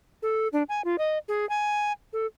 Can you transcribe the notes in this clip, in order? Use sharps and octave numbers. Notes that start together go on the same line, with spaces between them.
A4
D4
G#5
F4
D#5
G#4
G#5
A4